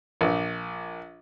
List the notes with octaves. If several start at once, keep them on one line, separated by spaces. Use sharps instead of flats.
A#1